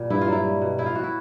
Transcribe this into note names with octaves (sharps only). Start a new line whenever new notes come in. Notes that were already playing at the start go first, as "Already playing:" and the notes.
Already playing: A#2 G3
G2 E4
F4
F#3 E4
G3
B2
A2 E4
F4
A2 F#4
E4